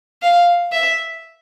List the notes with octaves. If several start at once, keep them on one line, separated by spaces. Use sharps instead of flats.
F5
E5